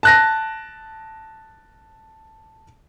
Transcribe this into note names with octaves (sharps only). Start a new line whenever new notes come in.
A5 F#6 A#6